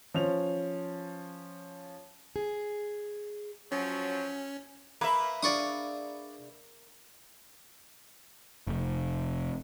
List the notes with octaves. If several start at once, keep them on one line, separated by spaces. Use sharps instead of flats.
F3 C#4 F7
G#4
F3 F#3 C#4
A#3 B4 E5
D4 G#4 D5 F5 C#6 D#6
F1